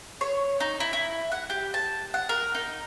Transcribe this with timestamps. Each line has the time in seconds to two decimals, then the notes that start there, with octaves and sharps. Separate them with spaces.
0.21 C#5
0.60 D#4
0.80 E4
0.93 E4
1.32 F#5
1.50 G4
1.74 A5
2.14 F#5
2.29 A#4
2.55 D#4